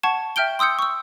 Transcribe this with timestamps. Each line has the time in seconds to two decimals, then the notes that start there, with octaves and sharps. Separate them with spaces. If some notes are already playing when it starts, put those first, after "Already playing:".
0.03 F#5 A5 C#6 G#6 E7
0.36 E5 G5 F6 G6 D7 G7
0.59 C6 D#6 E6 G6 C#7
0.79 C#6 E6